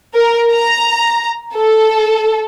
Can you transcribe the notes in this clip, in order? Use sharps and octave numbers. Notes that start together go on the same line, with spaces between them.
A#4
A#5
A4